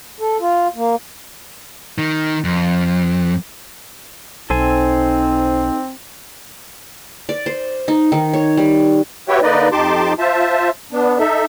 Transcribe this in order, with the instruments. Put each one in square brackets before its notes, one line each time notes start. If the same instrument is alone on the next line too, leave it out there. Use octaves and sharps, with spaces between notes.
[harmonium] A4
F4
A#3
[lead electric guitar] D#3
F2
[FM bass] B1 [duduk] C4 [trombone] D#4 [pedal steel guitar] A4 C5 G#5
[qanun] D5
C5
D#4
D#3
C#5
G3
[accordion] F#4 G4 B4 C#5 E5 G5
D3 A#3 D#4 B4 D5 D#5
F2 D#4 G4 A5 C6 D6
F4 C5 E5 A5
B3 D4
D#4 A4 E5